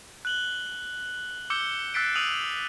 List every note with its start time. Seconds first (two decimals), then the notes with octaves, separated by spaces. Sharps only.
0.25 F#6 F#7 G7
1.50 D6 E6 G6 C#7 G7
1.94 E6 F#6 A6 B6 C7 D7
2.15 D#6 E6 D#7 F7 F#7